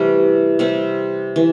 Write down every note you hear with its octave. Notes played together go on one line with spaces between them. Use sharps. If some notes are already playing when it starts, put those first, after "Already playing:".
Already playing: C3 E3 G3 A3
C3 G3 C4
E3